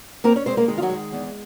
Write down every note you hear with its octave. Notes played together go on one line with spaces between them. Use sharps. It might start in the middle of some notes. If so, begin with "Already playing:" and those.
A#3 C4 A#4
C#4 C#5
G#3 C4 C5
A#3 A#4
D#3 G#3 G#4
F4
F#3 F#4
G#3
E2